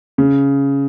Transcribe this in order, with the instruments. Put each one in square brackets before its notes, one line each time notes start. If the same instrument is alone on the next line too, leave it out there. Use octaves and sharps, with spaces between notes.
[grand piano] C#3